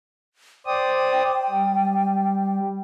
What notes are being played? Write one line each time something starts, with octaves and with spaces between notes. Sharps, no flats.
C5 D5 G5 D#6
G3